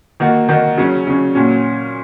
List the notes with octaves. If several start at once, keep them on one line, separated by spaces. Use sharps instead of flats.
D#3 A#3 F#4
D#3 A#3 F#4
C#3 F#3 C#4
C#3 F#3 C#4
A#2 F#3 C#4